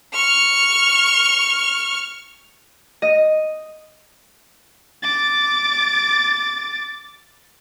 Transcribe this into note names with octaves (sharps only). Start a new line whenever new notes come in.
C#6 F6
D#5
D6 A6